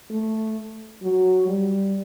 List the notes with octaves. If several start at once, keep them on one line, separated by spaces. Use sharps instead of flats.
A3
F#3
G3